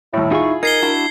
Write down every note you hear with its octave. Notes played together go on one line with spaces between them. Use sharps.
D#2 A2 E4
D#4 F4 G#4 C#6
D#4 A#4 G#6 C7 G7
D4 E4 F#4